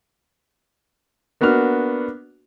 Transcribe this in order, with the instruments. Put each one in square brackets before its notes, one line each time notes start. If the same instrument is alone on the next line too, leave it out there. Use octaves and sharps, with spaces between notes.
[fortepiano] A#3 B3 D4 F#4 F6